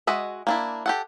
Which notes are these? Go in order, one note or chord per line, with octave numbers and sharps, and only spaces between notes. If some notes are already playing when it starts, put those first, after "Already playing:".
G#3 F#4 D#5 E5
A#3 D4 E4
G4 A4 F#5